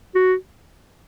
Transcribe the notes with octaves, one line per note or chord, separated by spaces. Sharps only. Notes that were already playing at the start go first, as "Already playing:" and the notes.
F#4